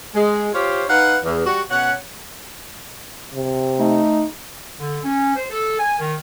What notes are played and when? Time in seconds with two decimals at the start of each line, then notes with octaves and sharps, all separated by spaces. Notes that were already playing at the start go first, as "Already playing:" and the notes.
0.14 G#3
0.53 F4 G4 C5 C#5 F5
0.88 D#4 B4 F5 F#5
1.23 E2
1.45 G3 F#4
1.70 B2 C#4 C#5 F#5
3.33 C3
3.79 A3 D#4
4.80 D3
5.03 C#4
5.36 C5
5.51 A4
5.79 G#5
6.00 D#3